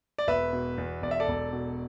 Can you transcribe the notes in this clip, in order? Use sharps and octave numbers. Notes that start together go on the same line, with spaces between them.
D5
E1 B4 E5
B2
E2
E1 D5
E5
A4 D5
E1
B2